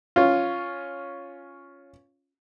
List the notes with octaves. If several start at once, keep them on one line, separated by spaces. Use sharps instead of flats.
C#4 F4